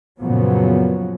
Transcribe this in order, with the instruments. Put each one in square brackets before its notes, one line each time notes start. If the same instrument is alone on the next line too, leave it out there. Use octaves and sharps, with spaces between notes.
[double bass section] F#2 A#2 C#3 F3 F#3 B3